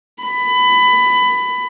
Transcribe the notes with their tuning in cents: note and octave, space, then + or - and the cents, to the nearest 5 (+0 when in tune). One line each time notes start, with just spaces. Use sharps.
B5 +20